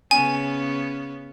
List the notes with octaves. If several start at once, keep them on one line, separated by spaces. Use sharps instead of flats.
C#3 B3 C#4 G#5